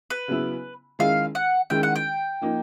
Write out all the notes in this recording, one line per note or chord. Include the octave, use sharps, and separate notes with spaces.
B4
C#3 F#3 B3 E4
D#3 G#3 C#4 E4 F5
F#5
D#3 G#3 C#4 E4 G5
F#5
G5
F3 A#3 D#4